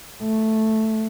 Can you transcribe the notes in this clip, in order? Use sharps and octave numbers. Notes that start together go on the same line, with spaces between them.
A3